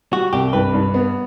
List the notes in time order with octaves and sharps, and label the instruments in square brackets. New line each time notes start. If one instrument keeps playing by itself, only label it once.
[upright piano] G3 [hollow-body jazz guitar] F#4
[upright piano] C2 [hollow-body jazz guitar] G4
[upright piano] G2 [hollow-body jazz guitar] B4
[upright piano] G2
B3